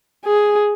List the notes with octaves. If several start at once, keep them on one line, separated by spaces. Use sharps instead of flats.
G#4